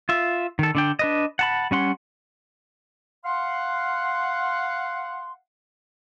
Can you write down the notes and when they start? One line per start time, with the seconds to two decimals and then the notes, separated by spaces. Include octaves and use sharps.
0.09 F4 E5
0.59 D#3 A4
0.75 D3 D4 G5
0.99 D4 B4 D#5
1.39 F#5 A5 B5
1.71 G3 C#4 F#5 C6
3.25 F5 F#5 C6